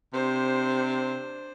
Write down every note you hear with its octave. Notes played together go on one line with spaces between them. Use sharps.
C3 D4 C5